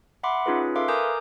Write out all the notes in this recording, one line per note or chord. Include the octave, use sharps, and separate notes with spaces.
E5 F#5 B5 C6 D6
C#4 D#4 F4 G#4 B4
A4 B4 E5 F5 C6 D6
A#4 G#5 A#5 D6 D#6 G6